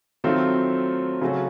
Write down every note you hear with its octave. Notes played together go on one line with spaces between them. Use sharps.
D#3 F#3 A3 C4 F4
C#3 F#3 A3 C#4 F#4